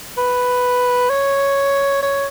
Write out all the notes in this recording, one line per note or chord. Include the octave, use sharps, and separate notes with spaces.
B4
C#5
C#5